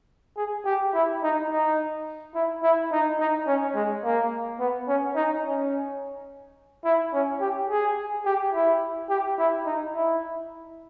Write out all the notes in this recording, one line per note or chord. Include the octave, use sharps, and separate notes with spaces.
G#4
G4
E4
D#4
D#4
E4
E4
D#4
D#4
C#4
G#3
A#3
B3
C#4
D#4
C#4
E4
C#4
G4
G#4
G4
E4
G4
E4
D#4
E4